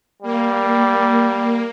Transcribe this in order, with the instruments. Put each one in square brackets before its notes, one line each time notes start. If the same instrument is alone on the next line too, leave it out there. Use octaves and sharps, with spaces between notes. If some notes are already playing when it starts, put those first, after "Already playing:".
[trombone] G3 [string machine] A#3